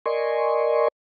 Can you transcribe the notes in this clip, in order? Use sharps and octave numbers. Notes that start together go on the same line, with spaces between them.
A#4 D5 D#5 G#5 C6 C#6